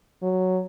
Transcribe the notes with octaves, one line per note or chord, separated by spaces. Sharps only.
F#3